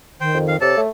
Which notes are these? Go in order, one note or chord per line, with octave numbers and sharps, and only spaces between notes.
D#3 C5 G5
F2
F5
C3 A4 C#5 D5 A5
A3